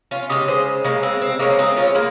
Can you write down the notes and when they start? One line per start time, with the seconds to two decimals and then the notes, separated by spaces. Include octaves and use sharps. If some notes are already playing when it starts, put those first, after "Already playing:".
0.11 C#4 F4
0.29 C#3 G#3 D#4 G4
0.48 G#4 C5
0.84 C#3 G#3 A#3
1.03 C4
1.22 C4
1.39 C#3 G#3 A#3 C#4
1.58 C4 D#4
1.77 C#4 F4
1.95 G#3 A#3